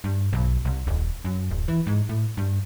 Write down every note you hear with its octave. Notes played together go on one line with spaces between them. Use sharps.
G2
B1
C2
D#1
F#2
D1
E3
G#2
A2
G2